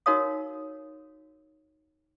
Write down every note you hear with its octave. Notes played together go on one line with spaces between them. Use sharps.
D#4 F#4 A#4 C#5 F5 D#6